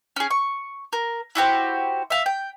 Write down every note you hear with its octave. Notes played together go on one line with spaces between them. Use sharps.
C#4 G#4
C#6
A#4
E4 F#4 G4 C5
E5 F5
G5